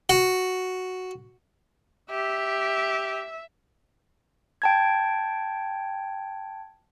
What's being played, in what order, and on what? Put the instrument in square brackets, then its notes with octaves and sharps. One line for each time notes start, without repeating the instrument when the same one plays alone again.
[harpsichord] F#4
[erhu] G4 [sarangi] E5
[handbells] G5 A5 G#6